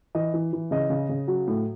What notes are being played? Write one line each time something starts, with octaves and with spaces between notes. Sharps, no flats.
E3 D#5
E3
E3
C#3 D#5
C#3
C#3
F#3
A2